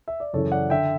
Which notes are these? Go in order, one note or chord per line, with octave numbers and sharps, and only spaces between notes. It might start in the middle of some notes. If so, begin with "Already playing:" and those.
E5
D5
F#2 C#3 E3 A4 C#5
D5 F#5
D3 E5 G5